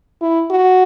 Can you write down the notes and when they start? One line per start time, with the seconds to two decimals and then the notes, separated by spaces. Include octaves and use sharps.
0.22 E4
0.50 F#4